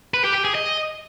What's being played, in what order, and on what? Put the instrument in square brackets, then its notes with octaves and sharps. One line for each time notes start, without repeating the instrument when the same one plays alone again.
[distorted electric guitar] B4
G4
G4
G#4
D#5